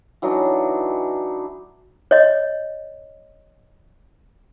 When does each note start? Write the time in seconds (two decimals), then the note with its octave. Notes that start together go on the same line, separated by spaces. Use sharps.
0.22 E3 F#3 D4 D#4
2.11 C#5 D#5